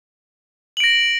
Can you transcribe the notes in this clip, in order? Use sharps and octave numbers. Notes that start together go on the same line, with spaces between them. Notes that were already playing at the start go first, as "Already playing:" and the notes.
A#6 D7 F#7